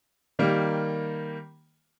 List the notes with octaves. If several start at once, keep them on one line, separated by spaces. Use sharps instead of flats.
D#3 G3 A#3